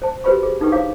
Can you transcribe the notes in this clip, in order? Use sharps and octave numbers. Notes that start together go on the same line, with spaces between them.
C5 A5
F#4 G4 B4 C5 B5 C#6
G#4
D4 D#4 A4 B4 G5 C#6
E4 C5 C#5 F5 D6